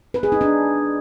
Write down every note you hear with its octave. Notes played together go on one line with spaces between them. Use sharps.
B4
G#4
D#4
D4